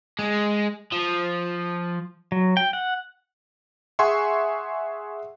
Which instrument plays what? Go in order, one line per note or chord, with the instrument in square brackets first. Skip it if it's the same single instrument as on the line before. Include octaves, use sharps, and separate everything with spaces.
[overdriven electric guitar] G#3
F3
[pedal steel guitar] F#3
G5
F#5
[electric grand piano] G#4 E5 F#5 G#5 C6 C#6